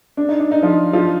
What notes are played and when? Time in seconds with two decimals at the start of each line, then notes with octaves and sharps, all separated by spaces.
0.17 D4
0.29 D#4
0.40 D4
0.52 D#4
0.63 F3 F4
0.93 F3 F4